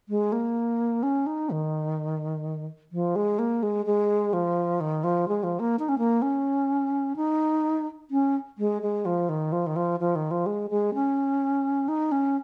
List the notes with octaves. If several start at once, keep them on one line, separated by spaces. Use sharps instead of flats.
G#3
A#3
C#4
D#4
D#3
F3
G#3
A#3
G#3
G#3
F3
D#3
F3
G#3
F3
A#3
D#4
C#4
A#3
C#4
D#4
C#4
G#3
G#3
F3
D#3
F3
D#3
F3
F3
D#3
F3
G#3
G#3
C#4
D#4
C#4